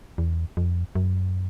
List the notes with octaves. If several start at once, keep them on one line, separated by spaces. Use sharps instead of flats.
E2
F2
F#2